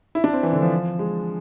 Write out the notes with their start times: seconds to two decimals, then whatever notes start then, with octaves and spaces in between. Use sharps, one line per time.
0.15 E4
0.24 D4
0.33 C4
0.43 E3
0.53 D3
0.62 F3
0.99 G#3